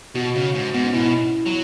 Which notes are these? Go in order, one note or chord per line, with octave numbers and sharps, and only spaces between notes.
B2 F#4
C#3
G#2
G#2 B3
C#4
B2 E4
F#3